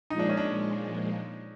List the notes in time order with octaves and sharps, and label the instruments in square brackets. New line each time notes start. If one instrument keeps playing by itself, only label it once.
[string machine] A#2 F3 G#3 [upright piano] D#4
[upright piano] D4
C#4
D4